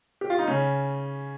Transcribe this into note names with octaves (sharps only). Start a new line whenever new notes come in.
G4
F4
D#4
C#3 C#4